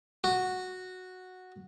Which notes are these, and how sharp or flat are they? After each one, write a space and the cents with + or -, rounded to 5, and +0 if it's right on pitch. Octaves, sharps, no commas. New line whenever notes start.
F#4 -5